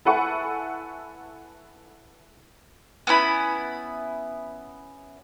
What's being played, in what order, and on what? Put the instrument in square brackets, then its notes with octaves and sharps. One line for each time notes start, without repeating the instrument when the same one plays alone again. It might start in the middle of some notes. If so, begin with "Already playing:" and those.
[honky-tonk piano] E4 A4 B4 F#5 G#5 C#6
[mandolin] B3 C#4 E4 B5